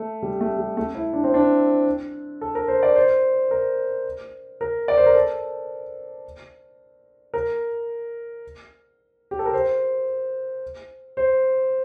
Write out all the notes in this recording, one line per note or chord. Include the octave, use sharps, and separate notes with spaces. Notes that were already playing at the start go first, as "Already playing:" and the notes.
Already playing: A3
G3
A3
G3
A3
E4
D4
C4
D4
A4
A#4
C5
D5
C5
A#4
A#4
D5
C5
A#4
A4
A#4
G4
A4
A#4
C5
C5